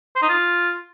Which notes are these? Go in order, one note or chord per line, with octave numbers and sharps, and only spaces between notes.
C5
D#4
F4